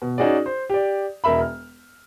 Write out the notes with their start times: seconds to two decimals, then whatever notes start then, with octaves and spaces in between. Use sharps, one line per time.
0.02 B2
0.18 C#4 D#4 F#4 G#4 D5
0.46 C5
0.70 G4 D5
1.24 E1 A#4 E5 B5
1.41 F6